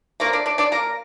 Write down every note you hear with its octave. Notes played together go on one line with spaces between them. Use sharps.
F3 A3 A#3 D4 A#4
D4 D5
D4 D5
D4 D5
A#3 A#4